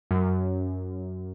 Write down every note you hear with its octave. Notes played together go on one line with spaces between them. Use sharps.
F#2